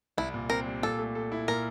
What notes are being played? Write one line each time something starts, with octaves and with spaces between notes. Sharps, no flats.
C2 E4
A#2
C4 A#4
G3
A#2 A4
A3
A4
E4
A#2 A#4